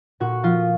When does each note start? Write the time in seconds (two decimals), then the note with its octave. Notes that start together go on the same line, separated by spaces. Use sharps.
0.20 A#2 F#4
0.43 F3 F4